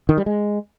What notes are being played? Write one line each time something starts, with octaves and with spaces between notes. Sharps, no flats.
D#3
G3
G#3